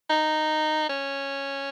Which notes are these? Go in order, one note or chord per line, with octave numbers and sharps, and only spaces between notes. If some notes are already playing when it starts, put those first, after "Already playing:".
D#4
C#4